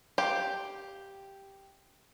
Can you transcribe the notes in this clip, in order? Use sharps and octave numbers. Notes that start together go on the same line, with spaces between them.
G4 F5